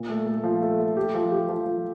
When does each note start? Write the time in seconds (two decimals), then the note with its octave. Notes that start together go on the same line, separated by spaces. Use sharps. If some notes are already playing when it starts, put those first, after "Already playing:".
Already playing: A#2
0.09 A3
0.26 A3
0.44 F3
0.62 A3
0.79 A3
0.97 G4
1.14 F3
1.32 G4
1.49 F3
1.66 F3